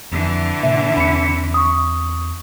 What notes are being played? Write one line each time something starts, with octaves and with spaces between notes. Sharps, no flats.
F2 D3 E3
A2 C3 A#3 E5
E2 C4 B5 C#7
C#6 D#6